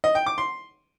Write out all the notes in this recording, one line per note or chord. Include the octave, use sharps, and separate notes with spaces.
D#5
G5
D6
C6